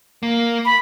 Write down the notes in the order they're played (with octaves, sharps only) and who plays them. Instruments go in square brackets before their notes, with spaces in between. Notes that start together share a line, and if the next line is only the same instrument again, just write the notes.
[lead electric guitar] A#3
[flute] B5